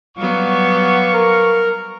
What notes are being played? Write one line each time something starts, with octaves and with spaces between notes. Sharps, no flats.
F#3 G3 B3 F5 C#6
A#4